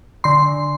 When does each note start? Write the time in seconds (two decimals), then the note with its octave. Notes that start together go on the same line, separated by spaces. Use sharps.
0.24 D3 C6